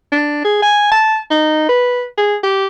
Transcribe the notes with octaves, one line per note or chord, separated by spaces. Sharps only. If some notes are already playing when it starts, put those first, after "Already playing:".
D4
G#4
G#5
A5
D#4
B4
G#4
G4